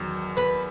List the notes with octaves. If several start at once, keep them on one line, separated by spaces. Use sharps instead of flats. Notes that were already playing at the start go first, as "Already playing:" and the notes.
Already playing: E2 D#3 F#3
B4